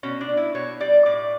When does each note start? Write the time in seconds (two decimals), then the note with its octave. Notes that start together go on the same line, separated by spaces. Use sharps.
0.03 B2 C#4
0.21 D4
0.29 B2
0.37 E4
0.55 B2 C#5
0.80 G3 D5
1.06 A2 D5